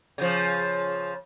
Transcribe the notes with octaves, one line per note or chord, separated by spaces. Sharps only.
C#3 F3